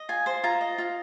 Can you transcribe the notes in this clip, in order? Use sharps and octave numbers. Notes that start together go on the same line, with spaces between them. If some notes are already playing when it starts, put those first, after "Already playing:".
Already playing: D#5
F4 G#5
C5 C6
F4 A#5
D#5
F4